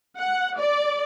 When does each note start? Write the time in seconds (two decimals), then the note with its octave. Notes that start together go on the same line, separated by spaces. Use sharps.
0.18 F#5
0.57 D5